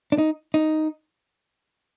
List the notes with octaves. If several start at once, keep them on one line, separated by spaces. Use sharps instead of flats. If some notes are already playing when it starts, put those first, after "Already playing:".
D4
D#4
D#4